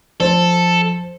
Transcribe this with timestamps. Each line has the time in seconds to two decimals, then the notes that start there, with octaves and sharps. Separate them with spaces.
0.20 F3 A4 C5